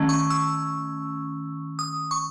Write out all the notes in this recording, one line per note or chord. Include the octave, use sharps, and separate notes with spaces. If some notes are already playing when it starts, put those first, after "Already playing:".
Already playing: D#3 A3 C#4
C#6
E6
D#6
C#6